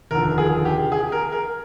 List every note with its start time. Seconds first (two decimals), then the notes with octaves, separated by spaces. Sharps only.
0.11 F1 D#2 D3 F3 A#4
0.38 G#4
0.65 G4
0.92 G#4
1.12 A#4
1.32 A#4